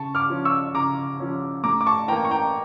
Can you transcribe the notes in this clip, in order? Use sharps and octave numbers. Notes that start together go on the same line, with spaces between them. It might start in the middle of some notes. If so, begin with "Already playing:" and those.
Already playing: C#3 A5 C#6
D6 F6
F3 C#4
C#6 E6
C#3 A#5 D6
F3 C#4
A2 A#5 D6
D6
A5 C#6
E3 A#3 G5 A#5
C#6
G5 A#5